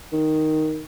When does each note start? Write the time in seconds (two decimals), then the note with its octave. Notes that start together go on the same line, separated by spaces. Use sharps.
0.13 D#3